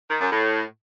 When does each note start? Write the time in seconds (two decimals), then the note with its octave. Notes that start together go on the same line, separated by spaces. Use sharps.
0.09 D#3
0.20 F#2
0.31 A2